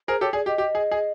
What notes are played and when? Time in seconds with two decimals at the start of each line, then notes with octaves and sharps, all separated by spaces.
0.08 G#4 A#4 C5
0.21 G4 A4 C#5
0.33 G#4 D5
0.46 G4 D#5
0.58 G4
0.75 G#4
0.91 G#4